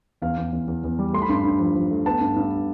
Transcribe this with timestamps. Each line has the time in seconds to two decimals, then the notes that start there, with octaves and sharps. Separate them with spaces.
0.22 E2 F5
0.37 E2
0.52 E2
0.68 E2
0.84 E2
0.99 G3
1.13 A3 C6
1.22 B5
1.29 G2 C6
1.44 G2
1.59 F3
1.75 F3
1.91 A3
2.06 B3 A5
2.21 G2
2.36 G2